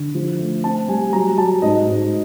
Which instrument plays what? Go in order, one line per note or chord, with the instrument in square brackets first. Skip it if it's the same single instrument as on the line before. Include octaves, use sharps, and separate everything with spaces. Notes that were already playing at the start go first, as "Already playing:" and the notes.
Already playing: [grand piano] D3
F3
A3
C4 A5
G3 G#5
F#3 A#5
F#3 A5
G#2 D#5
G#2